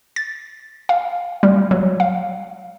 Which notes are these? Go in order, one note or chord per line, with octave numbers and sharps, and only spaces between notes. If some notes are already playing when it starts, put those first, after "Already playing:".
A6
F5
G3
F#3
F5